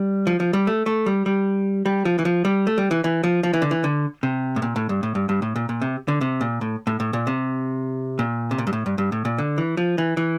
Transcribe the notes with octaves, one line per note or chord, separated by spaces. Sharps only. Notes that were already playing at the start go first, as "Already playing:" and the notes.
Already playing: G3
F3
F3
G3
A3
A3
G3
G3
G3
F3
E3
F3
G3
A3
G3
E3
E3
F3
F3
E3
D3
E3
D3
C3
A2
A#2
A2
G2
A2
G2
G2
A2
A#2
A#2
C3
D3
C3
A#2
A2
A2
A2
A#2
C3
A#2
C3
A#2
G2
A2
G2
G2
A2
A#2
D3
E3
F3
E3
E3